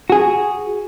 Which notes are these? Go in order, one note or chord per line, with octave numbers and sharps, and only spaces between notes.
F#4 G#4